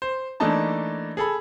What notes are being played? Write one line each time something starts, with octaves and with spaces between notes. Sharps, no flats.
C5
E3 A3 A#3 D4 D#4 A5
G#4 A4 B5